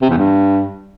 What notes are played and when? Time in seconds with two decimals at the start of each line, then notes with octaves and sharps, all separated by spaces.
0.02 C3
0.10 E2
0.18 G2